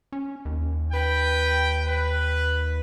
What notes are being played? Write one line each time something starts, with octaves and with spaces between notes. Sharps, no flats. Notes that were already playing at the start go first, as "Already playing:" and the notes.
C#4
D#2
B4 G5
B4